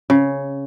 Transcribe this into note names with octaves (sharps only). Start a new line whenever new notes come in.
C#3